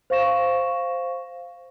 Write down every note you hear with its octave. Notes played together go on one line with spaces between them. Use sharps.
C5 F5 C#6 A#6 E7